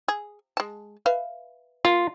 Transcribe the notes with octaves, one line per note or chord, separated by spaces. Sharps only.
G#4
G#3 A5
B4 E5 F5
A#3 F4